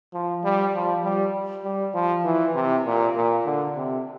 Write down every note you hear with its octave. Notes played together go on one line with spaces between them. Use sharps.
F3
G3
F3
G3
G3
F3
E3
C3
A#2
A#2
D3
C3